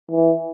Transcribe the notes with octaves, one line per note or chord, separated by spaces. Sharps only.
E3